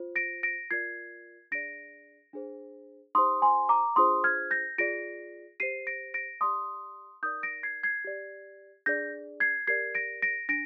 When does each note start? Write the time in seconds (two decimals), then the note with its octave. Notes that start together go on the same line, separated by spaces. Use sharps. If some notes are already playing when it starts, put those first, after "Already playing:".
Already playing: F4 C5
0.16 A#6 D7
0.43 A#6 D7
0.70 F4 A#4 D5 G#6 C7
1.51 D4 G#4 D5 A#6 D7
2.33 D4 G#4 C5
3.15 D#4 G4 C5 C6 D#6
3.42 G#5 C6
3.69 A#5 D6
3.96 D4 F4 G#4 C5 C6 D#6
4.24 F6 G#6
4.51 G6 A#6
4.78 F4 G#4 D5 A#6 D7
5.60 G4 C5 C7 D#7
5.87 A#6 D7
6.14 A#6 D7
6.41 G4 D5 C6 D#6
7.23 D#4 A#4 D5 D#6 G6
7.43 A#6 D7
7.63 G#6 C7
7.83 G#6 C7
8.05 G4 D5
8.86 D4 G#4 D5 G6 A#6
9.40 G#6 C7
9.67 G4 A#4 D5 G#6 C7
9.95 A#6 D7
10.22 A#6 D7
10.49 D4 A#6 D7